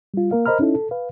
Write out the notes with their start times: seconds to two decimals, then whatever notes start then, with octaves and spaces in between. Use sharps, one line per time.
0.14 G3 F4
0.31 A#3 A#4 F5
0.46 A#4 C5 D#5 A#5 B5 F6
0.60 C#4 D#4 E4 A4
0.74 A4
0.91 B4 F5